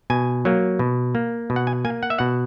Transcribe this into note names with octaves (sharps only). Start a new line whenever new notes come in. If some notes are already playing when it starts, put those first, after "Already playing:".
B2 G#5
F#3 A#3
B2
A#3
B2
F#5
G#5
A#3 G#5
F#5
E5
B2 F#5